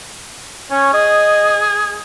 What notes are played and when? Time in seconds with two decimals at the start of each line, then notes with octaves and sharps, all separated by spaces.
0.71 C#4 C#5
0.93 G#4 D#5